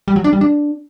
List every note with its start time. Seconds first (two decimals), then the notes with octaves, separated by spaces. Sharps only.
0.08 G3
0.16 F#3
0.24 D4
0.33 G3
0.41 D4